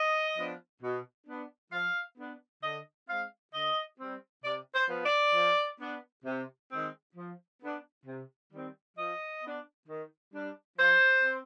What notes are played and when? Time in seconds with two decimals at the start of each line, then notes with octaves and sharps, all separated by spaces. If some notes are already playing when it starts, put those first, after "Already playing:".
Already playing: D#5
0.36 F3 B3 D4
0.81 B2
1.27 B3 D4
1.71 F3 F5
2.17 B3 D4
2.62 D3 D#5
3.07 G#3 C4 F5
3.53 D3 D#5
3.98 G3 C4
4.43 C3 D5
4.74 C5
4.89 F3 B3
5.04 D5
5.34 F3
5.80 B3 D4
6.25 C3
6.71 D#3 G#3 C4
7.15 F3
7.61 B3 D4
8.05 C3
8.51 D#3 G3 C4
8.96 F3 D#5
9.42 B3 D4
9.87 D#3
10.33 G3 D4
10.77 F3 C5
11.23 C4